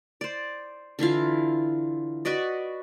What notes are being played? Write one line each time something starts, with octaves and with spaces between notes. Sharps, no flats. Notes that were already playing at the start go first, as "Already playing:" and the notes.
C5 D5
D3 E3 E4 F4
F#4 B4 D5 D#5